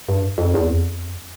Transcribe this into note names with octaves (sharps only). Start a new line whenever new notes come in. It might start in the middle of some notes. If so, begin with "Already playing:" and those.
G2
F2
E2
F2